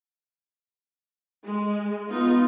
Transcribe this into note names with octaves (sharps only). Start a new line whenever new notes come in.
G#3
B3 D#4 F4